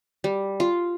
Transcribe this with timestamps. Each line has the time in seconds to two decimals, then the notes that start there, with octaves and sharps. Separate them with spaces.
0.24 G3
0.60 F4